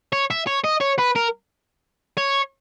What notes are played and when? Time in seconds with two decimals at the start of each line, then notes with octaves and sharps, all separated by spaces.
0.13 C#5
0.31 E5
0.47 C#5
0.64 D#5
0.81 C#5
0.99 B4
1.16 A#4
2.17 C#5